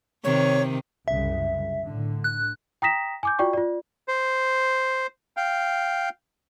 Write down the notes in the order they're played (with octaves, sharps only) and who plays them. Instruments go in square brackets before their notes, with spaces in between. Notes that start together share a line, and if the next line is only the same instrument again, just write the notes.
[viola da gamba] C3 D#3 [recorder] C#5
[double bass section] C2 F#2 C#3 [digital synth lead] E5
[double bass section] A2 D3
[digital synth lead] F#6
[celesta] G5 A#5 D#6 A#6 B6 E7
G#5 D6 G6
F4 F#4 D5 G5 C#6
F4 D5
[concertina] C5
F5 G5